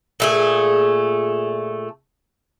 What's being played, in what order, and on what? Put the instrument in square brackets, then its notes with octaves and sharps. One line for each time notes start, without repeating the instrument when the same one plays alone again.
[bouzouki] A#2 A3 G#4